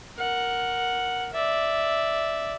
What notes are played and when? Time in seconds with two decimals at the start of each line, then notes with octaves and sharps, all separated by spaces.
0.17 A#4 F#5
1.33 D5 E5